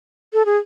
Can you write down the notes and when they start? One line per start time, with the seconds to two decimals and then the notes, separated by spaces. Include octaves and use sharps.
0.33 A4
0.45 G#4